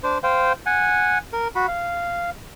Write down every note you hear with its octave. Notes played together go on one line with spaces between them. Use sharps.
D4 C5
C5 F5 G5
F#5 G#5
A#4
F#4 B5
F5